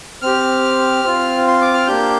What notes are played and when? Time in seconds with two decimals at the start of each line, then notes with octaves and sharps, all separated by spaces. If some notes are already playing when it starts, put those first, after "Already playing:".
0.22 C4 G4 F6
1.04 C4 F4
1.48 C6
1.61 D6
1.74 F6
1.87 A#3 D4 G4 G6